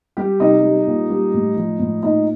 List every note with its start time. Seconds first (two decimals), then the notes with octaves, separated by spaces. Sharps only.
0.17 G3 G4
0.40 C3 D#4
0.63 G3
0.87 A#2
1.10 G3
1.34 A2
1.57 F3
1.79 A2
2.03 A#2 D#4